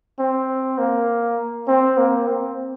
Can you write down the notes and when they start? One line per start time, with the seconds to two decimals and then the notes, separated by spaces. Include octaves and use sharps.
0.19 C4
0.78 A#3
1.68 C4
1.98 A#3
2.28 C4